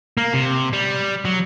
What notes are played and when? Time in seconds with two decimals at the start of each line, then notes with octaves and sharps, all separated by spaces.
0.17 A#3
0.33 C3
0.73 G3
1.25 F#3